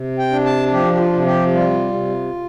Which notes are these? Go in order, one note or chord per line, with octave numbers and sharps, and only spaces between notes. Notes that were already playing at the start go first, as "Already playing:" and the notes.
Already playing: C3
G5
D4
A5
F3 G4
G4
F4
C3
G4
G3 F4
C3